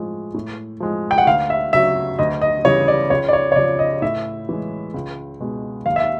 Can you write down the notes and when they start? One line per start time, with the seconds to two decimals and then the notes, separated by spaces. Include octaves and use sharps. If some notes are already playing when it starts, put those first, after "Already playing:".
Already playing: A2 F3 G#3
0.34 A2
0.80 F3 G#3
1.11 G5
1.18 F#5
1.27 D2 F5
1.50 E5
1.73 C#3 F#3 E5
2.19 D2 D#5
2.42 D#5
2.65 C#3 E3 G3 C#5
2.88 D5
3.10 C#2 C#5
3.28 D5
3.33 C#5
3.52 C#5
3.56 C#3 F3 D5
3.79 D#5
4.02 A2 E5
4.49 E3 G#3
4.94 C#2
5.40 B2 G#3
5.86 D#2 F5
5.96 E5